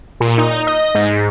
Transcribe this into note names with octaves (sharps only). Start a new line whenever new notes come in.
A#2
D#4
D#5
G#2